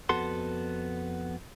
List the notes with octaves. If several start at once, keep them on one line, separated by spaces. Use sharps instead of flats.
F2 B3 F#4 A4 C6